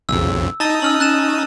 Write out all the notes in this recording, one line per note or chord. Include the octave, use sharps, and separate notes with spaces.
B1 F2 C#3 E6
D#4 D#5 A5 D#6 A6
C#4 E6 F6 F#7
C#4 F#6 A6 E7